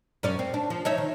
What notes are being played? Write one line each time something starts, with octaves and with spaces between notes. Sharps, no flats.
F#2 C#4 D5
C4
D4
F3
D#4 C#5 E5
D#3